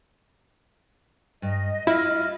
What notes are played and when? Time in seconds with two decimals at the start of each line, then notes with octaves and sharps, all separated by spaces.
1.42 G2 D#5
1.87 E4 F4 F6